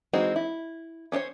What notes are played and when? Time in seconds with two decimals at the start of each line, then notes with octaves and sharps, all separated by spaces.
0.13 E3 G#3 C4 D#4 F#4
0.36 E4
1.12 C#4 D4 C5 C#5